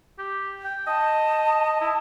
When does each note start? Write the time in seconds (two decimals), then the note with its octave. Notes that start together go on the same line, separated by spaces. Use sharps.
0.18 G4
0.64 G5
0.87 D#5 A5
1.81 E4